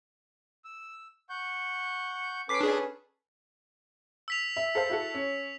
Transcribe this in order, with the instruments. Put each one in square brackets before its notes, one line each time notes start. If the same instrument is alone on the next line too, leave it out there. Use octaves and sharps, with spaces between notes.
[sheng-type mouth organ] E6
F#5 C#6 G6
[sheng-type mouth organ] C#4 A4 B4 [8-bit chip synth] D6 B6 C7
[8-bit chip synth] D4 G#4
[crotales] E6 B6 F7
[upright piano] E5
A4 C5 F5
E4 F#4 A4
C#4